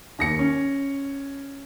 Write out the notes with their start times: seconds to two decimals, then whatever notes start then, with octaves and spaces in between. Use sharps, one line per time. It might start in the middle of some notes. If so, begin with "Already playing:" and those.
0.19 D#2 A#6 C#7
0.39 C#4